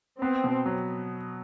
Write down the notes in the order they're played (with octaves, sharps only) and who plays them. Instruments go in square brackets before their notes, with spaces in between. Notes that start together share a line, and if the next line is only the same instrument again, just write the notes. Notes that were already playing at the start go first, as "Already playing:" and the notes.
[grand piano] B3 [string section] C4
[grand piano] B2
F#3